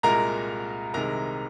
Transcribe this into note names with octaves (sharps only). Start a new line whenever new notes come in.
C2 A#2 G#3 A#4 A#5
C2 C3 D#3 G#3 A#4 A#5